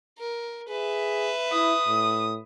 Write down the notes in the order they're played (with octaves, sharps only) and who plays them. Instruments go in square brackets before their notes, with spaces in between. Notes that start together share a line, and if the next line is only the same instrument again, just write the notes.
[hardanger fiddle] A#4
[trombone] G#4 [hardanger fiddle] B4 E5
[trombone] E4 [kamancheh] D#6
[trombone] A2